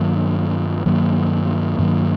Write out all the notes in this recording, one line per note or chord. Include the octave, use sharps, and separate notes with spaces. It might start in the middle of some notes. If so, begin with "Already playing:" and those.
Already playing: G2 D#3 F#3 A#3
G2 D#3 F#3 A#3
G2 D#3 F#3 A#3